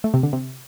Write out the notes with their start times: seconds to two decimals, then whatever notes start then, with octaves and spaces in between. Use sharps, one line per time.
0.04 A3
0.14 C3
0.23 D3
0.33 C3